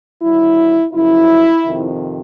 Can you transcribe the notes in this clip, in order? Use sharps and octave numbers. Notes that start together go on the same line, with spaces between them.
D#2 D3 F#3 E4
F#2 C#3 F3 E4
F2 C3 D#3